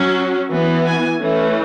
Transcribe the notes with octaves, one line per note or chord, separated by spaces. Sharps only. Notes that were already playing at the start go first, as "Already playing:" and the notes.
Already playing: F#3 C#4
E3 B3
G#5
E3 A3 C#4